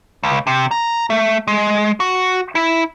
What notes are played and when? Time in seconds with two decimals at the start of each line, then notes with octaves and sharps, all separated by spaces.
0.23 C#2
0.47 C3
0.71 A#5
1.10 A3
1.48 G#3
2.00 F#4
2.55 E4